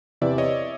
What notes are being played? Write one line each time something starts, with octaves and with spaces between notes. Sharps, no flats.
E2 C3 E3 D5 E5
C#5 D#5